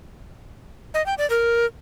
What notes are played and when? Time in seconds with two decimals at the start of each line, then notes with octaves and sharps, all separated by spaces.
0.94 D#5
1.06 G5
1.18 D5
1.30 A#4